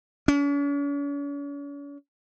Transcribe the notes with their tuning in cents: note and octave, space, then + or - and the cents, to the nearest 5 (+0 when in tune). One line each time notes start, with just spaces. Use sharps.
C#4 +45